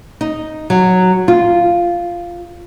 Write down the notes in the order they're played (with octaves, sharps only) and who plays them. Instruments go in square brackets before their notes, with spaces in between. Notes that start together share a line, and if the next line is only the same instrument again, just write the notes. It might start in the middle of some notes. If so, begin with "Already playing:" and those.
[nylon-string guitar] D#4
F#3
F4